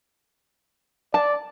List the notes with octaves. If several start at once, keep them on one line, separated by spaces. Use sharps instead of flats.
D5 A5